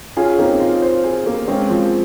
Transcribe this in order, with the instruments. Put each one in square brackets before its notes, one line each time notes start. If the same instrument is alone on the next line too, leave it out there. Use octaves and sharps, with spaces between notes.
[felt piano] C#4 F4 [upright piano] G#4
[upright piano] A#3 [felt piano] C4 D#4
[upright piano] F4
C5
G#4
A#3
[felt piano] G#3 C4 [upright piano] C#4
[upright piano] F3